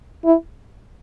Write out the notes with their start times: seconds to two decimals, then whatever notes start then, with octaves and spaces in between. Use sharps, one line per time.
0.25 E4